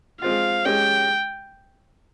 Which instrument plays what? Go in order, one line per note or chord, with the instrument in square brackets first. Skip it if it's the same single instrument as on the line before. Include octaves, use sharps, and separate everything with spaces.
[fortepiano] G#3 C4 F4 [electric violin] F5
[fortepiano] G#3 C#4 G4 [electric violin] G5